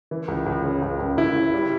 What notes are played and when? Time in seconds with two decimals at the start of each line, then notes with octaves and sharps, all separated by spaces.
0.11 E3
0.28 C#2
0.46 C#2
0.64 C#3
0.82 C#2
0.99 C#2
1.17 C#2 E4
1.36 C#3
1.54 G3